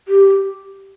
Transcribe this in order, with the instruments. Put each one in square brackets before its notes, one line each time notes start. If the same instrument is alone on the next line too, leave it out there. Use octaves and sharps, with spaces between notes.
[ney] G4